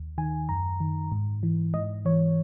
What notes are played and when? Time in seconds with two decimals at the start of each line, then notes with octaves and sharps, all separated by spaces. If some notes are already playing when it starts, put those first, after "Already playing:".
Already playing: D#2
0.18 D#3 G#5
0.49 F#2 A#5
0.80 D#3
1.12 G#2
1.43 E3
1.74 G#2 D#5
2.05 E3 C#5